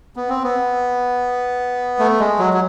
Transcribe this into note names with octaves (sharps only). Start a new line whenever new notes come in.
B3
C4
B3
A3
G#3
F#3
F#3